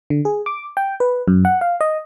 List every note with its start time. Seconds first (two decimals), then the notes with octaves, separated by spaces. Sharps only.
0.10 D3
0.25 G#4
0.46 D6
0.77 G5
1.00 B4
1.28 F#2
1.45 F#5
1.61 F5
1.81 D#5